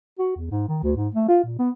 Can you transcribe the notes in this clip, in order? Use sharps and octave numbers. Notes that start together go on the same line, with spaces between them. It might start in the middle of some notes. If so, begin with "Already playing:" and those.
F#4
E2
G#2
D#3
D2
G#2
A3
F4
A#2
B3